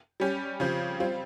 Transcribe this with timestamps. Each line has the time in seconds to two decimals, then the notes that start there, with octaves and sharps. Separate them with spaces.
0.20 G3 C#4 G4
0.60 C#3 F3 C4 G4
1.00 G3 C4 F4